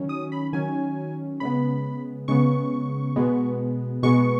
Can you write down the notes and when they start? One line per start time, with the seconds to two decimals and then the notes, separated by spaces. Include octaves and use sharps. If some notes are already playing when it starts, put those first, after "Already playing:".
Already playing: D#3 F#3 C#4
0.09 D#6
0.32 B5
0.53 D#3 F#3 C#4 G#5
1.40 C#3 G#3 B3 B5
2.28 C#3 G#3 B3 C#6
3.16 B2 G#3 B3
4.03 B2 G#3 B3 C#6